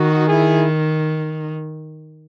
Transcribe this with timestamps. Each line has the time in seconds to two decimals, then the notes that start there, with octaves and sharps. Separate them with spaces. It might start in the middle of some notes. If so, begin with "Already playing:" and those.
Already playing: D#3 D#4 F#4
0.27 E4 G#4